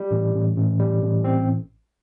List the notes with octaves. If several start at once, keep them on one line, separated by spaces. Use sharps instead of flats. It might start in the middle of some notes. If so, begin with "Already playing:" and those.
Already playing: G3
A1
A1
A1
G3
A1
C4